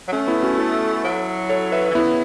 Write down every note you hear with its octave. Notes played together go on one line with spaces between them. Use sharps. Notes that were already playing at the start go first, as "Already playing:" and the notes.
F#3
A3 C#4
B3 E4
C#4 F#4
E4 A4
F#3
A4 C#5
B4 E5
E3
C#3 B3 E4